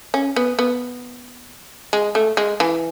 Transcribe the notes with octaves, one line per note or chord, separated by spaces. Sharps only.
C#4
B3
B3
G#3
A3
G#3
E3